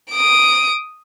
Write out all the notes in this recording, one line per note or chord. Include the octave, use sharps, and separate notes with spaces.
D#6 D7